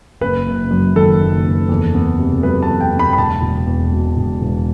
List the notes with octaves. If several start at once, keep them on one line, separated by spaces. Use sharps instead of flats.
F#1 B4
F#1
F#2
D#3 A4
F#1
F#1
E2
B3
C3
F#3 B4
A5
E2
G5
B3
B5
B5
E1 A5
E1
E2
B2
E1
E1